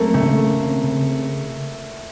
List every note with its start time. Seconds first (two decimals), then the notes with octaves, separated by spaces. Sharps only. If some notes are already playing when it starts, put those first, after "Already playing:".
Already playing: F#3 A3 A#3 C4
0.14 C#3 A3
0.38 C#3
0.60 C4
0.84 C#3